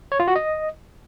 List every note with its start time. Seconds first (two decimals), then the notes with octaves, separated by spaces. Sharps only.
0.12 C#5
0.20 F4
0.28 F#4
0.36 D#5